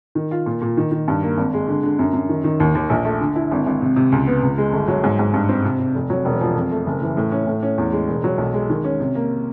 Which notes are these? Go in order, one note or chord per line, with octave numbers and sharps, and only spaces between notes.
D#3
F4
A#2
A#2
D#3
D#3
G2
A#3
G#1
G#3
D3
D3
F#2
F#2
D#3
D#3
D#2
D#2
A#1
A3
D3
E4
G#1
G#1
C3
C3
C#2
B3
C#2
G#3
G1
F#3
G#2
G#2
G2
C4
C3
C3
F1
F#3
E1
F3
F2
A3
F#1
E3
A2
C#4
A2
C#4
E2
G#3
E1
F#3
B1
G#3
D#3
C#4
C3
A#3